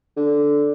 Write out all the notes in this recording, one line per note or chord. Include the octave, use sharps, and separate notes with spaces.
D3